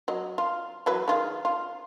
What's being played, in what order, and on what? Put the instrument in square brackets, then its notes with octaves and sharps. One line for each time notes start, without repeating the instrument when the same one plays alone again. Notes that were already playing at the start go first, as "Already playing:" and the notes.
[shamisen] F#3 D#5
F4
E3 F#3 B4
D#3 F4 G#4
F4